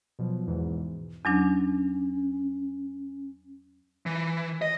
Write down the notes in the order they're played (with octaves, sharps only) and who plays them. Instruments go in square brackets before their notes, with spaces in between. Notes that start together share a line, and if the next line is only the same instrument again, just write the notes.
[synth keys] B2 F3 F#3
E2 G#2 B2 E3
[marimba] E2 F#3 D4 [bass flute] C#4
[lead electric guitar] E3
D#5